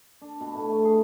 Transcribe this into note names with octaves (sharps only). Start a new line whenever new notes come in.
D4
B2
A2
A3
G#4